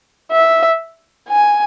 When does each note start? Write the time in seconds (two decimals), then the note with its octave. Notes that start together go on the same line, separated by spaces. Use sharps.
0.31 E5
1.29 G#5